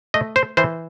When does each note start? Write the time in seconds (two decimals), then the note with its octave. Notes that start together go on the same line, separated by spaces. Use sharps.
0.14 A3 D#5
0.36 C5
0.57 E3 C5